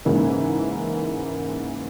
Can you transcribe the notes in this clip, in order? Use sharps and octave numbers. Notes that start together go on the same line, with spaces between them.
G#2 C#3 E3 A#3